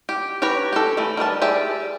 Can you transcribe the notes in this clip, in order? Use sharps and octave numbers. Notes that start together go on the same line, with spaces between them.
G4
G4 B4 C#5 A#5
G4 A4
E3 A3
D#3 G3 B4 A5
G4 G#4 D5 E5